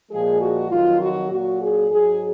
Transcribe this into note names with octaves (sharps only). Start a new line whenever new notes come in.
A#2 F3 G#3 G#4
F#4
F2 D#3 F#3 F4
F#4
A#2 F#3 F#4
G#4
G#2 F#3 G#4